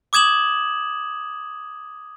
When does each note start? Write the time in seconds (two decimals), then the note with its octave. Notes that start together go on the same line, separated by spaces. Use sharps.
0.13 D6 D#6 G#6 E7 F#7